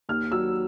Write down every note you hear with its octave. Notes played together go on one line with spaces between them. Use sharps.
D#2 F6
F#3 E6